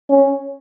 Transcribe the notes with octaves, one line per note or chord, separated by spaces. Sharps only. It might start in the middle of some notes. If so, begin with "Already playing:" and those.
C#4